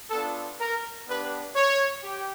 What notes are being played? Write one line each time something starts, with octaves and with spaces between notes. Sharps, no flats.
B3 D4 F4 A4
A#4
B3 D4 G4 B4
C#5
G4